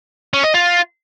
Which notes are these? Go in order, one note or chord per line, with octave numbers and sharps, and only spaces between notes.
C#4
D#5
F4